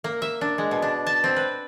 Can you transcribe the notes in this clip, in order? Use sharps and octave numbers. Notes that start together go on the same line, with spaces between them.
A#3
E5
D4
G#3
B2
D4
A5
C4
B4